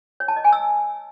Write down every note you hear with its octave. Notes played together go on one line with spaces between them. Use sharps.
C#5
A5
D#5
G#5
E6